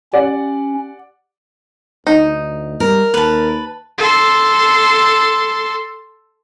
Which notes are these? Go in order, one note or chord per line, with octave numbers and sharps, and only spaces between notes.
C#4 G4 D5 F#5
D2 D#4
G3 A#4
D#2 B4 A5
A4 C6